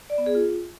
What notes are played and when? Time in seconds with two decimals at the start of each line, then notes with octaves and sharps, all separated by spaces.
0.10 D5
0.18 B3
0.26 G#4
0.35 F4